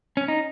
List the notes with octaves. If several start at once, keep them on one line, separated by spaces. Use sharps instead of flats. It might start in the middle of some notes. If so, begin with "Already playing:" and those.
C#4
D#4